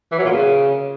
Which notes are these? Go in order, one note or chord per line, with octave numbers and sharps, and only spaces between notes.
E3
F#3
A#2
C#3